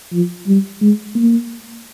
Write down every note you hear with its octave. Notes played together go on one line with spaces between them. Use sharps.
F3
G3
G#3
A#3